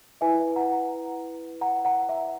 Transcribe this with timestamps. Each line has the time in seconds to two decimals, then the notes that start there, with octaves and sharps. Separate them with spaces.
0.21 E4 B4 E5 G#5
0.56 F#5 A#5
1.61 F#5 A#5
1.85 F#5 A#5
2.09 E5